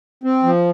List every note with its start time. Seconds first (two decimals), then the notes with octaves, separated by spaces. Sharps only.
0.24 C4
0.43 F3